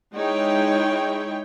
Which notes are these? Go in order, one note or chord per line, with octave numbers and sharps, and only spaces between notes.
G#3 D#4 E4 C#5 G5